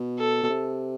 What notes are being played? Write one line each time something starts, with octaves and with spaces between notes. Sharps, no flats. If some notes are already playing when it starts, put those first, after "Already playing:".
Already playing: B2
A4
B2
C3